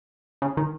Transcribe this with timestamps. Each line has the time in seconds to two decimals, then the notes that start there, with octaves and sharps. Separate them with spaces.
0.42 C#3
0.57 D#3